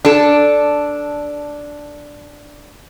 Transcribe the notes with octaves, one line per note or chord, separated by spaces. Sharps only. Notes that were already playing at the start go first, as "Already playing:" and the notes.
D4 A4